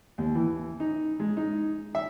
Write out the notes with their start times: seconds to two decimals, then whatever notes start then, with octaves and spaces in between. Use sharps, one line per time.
0.18 D#2
0.35 E3
0.80 D#4
1.20 G#3
1.37 D#4
1.95 E5